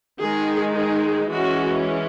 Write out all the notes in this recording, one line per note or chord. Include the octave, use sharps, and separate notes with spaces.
D#3 G#3 D#4 G#4
G#4
E3 G#3 C#4 F#4